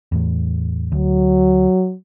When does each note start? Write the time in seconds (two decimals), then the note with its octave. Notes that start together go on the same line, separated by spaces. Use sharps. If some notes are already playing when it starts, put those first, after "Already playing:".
0.12 E2 A2
0.92 D2 F#3